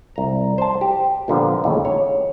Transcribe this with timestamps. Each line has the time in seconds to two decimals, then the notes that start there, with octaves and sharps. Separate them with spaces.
0.16 C2 A#5
0.58 C5 A5
0.81 G4
1.28 A#2 D3 F3 B3
1.64 D#2 A2 C#3
1.85 C#5